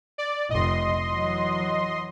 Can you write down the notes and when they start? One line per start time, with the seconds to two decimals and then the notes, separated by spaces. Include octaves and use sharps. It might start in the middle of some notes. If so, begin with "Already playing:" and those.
0.18 D5
0.50 F1 D#5 C6
1.09 E3 F#3